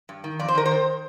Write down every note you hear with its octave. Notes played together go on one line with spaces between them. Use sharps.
G2
D#3
F2 D5
C5
D#3 A#4
C5
D#3